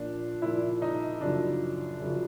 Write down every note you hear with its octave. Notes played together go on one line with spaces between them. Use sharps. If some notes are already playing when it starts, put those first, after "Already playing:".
Already playing: A#2 F3 D4
A#2 F3 E4
D#4
F#2 C#3 F3 D4
F#2 C#3 F3